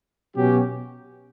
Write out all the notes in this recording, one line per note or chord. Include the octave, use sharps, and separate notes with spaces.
B2 F#3 C#4 G4